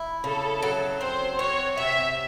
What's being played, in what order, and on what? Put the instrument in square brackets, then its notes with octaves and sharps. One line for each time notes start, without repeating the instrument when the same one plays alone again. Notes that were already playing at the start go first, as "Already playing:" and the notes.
Already playing: [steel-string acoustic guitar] E4
[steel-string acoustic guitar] C#3 [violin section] A4
[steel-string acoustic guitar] F#3
[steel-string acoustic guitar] C4 [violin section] C5
[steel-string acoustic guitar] F#4 [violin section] C#5
[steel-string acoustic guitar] C3 [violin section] E5